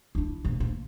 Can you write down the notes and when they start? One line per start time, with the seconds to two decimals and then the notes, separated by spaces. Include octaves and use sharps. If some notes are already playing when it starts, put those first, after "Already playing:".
0.15 D4 E4
0.45 A#1 B2
0.60 A#2